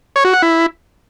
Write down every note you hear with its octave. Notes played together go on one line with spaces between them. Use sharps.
C#5
F#4
F#5
E4